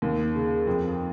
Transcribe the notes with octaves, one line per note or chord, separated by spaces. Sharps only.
D#2
C#3
F2